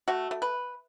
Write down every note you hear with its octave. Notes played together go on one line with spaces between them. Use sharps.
A3 F#4
A3
B4